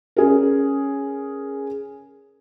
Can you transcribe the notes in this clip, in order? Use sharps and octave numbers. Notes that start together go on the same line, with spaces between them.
C#4 G#4 A#4